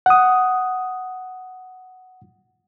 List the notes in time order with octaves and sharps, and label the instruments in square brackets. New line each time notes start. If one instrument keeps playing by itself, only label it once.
[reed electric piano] F#5 D#6